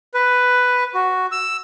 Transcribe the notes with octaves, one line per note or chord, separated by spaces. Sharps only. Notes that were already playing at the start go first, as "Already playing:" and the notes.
B4
F#4
E6